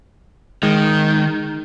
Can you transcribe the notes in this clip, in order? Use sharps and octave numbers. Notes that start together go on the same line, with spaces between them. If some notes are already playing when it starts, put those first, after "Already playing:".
D#3 G#3